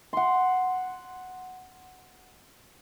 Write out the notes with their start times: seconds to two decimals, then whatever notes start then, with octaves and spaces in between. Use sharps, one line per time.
0.13 F#5 C6